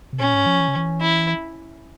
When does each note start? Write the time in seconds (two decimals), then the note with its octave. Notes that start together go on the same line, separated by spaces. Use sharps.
0.13 C3
0.19 A#2 C#4
0.34 G#2
0.46 F3
0.60 E3
0.68 C#3
0.76 E3
1.01 E4